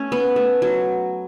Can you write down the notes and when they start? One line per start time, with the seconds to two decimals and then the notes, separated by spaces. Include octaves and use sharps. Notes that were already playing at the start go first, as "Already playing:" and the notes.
Already playing: A3 C#4
0.12 B3
0.36 A3
0.62 F#3